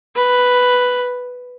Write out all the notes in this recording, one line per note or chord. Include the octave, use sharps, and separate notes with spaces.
B4